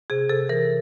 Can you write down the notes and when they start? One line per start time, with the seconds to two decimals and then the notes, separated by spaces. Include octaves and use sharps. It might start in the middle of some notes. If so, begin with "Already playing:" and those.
0.10 C3 G#4
0.29 C3 A4
0.49 E3 A#4